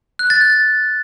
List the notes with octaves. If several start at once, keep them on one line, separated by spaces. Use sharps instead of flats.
F#6
A6
G6